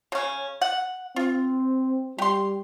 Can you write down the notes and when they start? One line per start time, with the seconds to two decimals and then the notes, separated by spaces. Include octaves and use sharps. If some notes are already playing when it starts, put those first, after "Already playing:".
0.12 C#3 C#4
0.61 F#5
1.16 C4 F4
2.18 G3 G4 C6